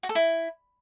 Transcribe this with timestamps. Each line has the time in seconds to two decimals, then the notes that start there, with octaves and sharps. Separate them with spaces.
0.03 F#4
0.09 A4
0.15 E4